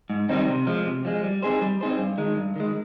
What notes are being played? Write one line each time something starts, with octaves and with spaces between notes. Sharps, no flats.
G#2
D#3 G3 C4 D#4
C3
F3 G#3
C3
F3 G#3
G3
C4 D#4 G#4 C5
G3
C4 D#4 G#4 C5
G2
D#3 G#3
G2
D#3 G#3